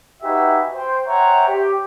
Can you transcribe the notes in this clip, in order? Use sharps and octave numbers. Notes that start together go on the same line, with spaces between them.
D#4 F#4 G4 B4 E5 G#5
C5 G5
C5 C#5 E5 F#5 G5 A#5
G4